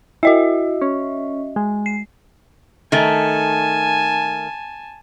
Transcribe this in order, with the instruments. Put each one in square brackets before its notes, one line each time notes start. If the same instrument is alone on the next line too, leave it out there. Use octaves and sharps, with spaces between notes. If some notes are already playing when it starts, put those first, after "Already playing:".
[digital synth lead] E4 [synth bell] F#4 D#5 E5
[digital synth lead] C#4
G#3
[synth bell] C7
[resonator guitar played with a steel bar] D#3 A3 [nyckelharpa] G#5 A5